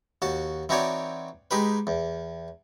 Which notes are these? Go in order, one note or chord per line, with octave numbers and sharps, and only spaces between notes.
D#2 F#4 A5
E3 C4 D#4 F#4 C#5 D5
G#3 D#4 G4 B4
E2